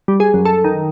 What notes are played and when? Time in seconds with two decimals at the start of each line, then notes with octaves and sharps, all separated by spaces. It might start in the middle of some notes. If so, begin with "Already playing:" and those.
0.08 G3
0.20 G#4
0.34 F#2
0.45 A4
0.64 D#3